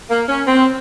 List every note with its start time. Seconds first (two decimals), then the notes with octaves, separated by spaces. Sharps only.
0.09 A#3
0.28 C#4
0.47 C4